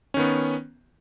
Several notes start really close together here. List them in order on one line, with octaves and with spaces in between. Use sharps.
C#4 D#3 B3